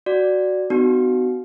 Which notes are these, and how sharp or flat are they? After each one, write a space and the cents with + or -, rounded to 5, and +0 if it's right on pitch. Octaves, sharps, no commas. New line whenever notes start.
F#4 +0 D5 +0
B3 +30 D#4 -35 F#4 +20